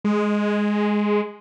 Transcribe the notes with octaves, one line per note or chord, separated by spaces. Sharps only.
G#3